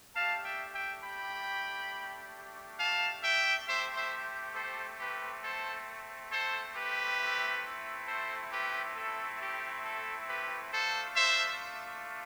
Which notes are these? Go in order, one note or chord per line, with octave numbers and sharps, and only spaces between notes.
A3 D4 G4 F5 A5
E5 G5
E5 G5
G5 B5
F5 A5
E5 G5
A3 C4 G4 C5 E5
C5 E5
A4 C5
G4 B4
A4 C5
A4 C5
G4 B4
A3 C4 E4
A4 C5
G4 B4
A4
G4
A4
G4 B4
A3 D4 F4 A4 C5
C5 E5